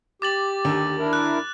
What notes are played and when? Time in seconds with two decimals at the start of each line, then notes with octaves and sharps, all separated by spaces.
0.22 G4 D6 A6 F#7
0.65 D#2 D3
0.98 D4 E4 A#4
1.13 F#6